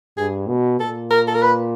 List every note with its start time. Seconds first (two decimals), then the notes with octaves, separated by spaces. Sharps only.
0.17 G2 G#4
0.49 B2
0.80 A#2 A4
1.11 A#4
1.28 A4
1.34 A#4
1.42 B4